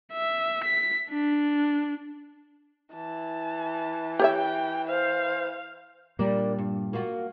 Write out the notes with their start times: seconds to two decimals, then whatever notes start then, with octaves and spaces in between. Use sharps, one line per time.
0.12 E5
0.64 B6
1.10 D4
2.95 E3 A5
4.20 G4 C#5 E5 G5
4.88 C5 F5
6.19 A#2 G3 A#3 D4 D5
6.58 G2
6.93 A#3 F4 F#4